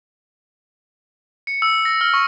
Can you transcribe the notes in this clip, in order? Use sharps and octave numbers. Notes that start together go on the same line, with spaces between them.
C#7
E6
A#6
F6
C#6